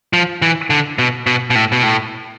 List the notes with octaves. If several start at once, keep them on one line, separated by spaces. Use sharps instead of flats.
F3
E3
D3
B2
B2
B2
A2
B2
A2